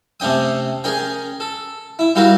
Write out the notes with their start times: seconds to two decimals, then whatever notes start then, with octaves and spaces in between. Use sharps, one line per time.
0.20 C3 A3 C#4 G5 D#6
0.84 C#4 G#4 A#4 G5
1.40 A4
1.99 E4
2.15 G3 E4 F#4 G4 A#4 F5